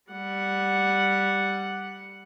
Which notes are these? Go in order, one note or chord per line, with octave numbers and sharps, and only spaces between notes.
G3 F#5